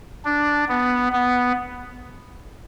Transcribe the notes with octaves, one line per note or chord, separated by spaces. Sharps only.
D4
B3
B3